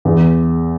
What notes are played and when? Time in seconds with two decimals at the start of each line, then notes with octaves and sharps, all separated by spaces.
0.05 E2